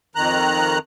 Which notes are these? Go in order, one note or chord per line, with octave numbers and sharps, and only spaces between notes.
F2 D#3 A#5 F#6